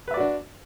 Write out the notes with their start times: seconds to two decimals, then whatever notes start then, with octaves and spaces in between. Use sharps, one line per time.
0.08 B4
0.11 E5
0.14 D5
0.17 F#4
0.20 D4